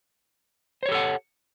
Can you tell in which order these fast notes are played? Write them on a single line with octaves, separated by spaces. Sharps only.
C5 C#5 G4 A4 F#5